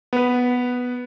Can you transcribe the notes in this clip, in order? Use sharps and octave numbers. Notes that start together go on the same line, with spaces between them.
B3 B4